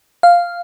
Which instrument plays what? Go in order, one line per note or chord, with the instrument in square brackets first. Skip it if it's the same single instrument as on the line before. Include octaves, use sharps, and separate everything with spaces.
[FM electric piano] F5